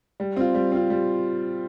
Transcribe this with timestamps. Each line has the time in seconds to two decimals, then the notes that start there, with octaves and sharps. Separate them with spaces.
0.20 G3
0.37 C4 F4
0.55 G3
0.72 C4 F4
0.90 G3